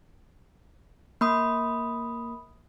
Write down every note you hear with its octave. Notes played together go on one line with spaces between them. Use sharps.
A#3 B5 D#6